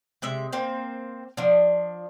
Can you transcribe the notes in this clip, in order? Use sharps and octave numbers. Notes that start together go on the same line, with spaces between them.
C3 G#3 E5
A#3 C4 C5
F3 D4